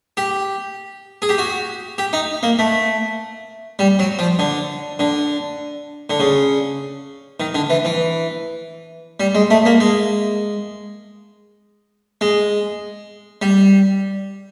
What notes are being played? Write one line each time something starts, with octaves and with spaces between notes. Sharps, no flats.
G4
G#4
G4
F#4
G4
D#4
A#3
A3
G3
F#3
F3
D3
D3
D3
C#3
D#3
D3
E3
E3
G3
G#3
A3
A#3
G#3
G#3
G3